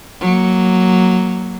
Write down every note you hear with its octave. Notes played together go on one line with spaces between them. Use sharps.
F#3 A#3